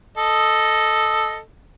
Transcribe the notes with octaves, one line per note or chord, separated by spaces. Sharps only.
A4 D#5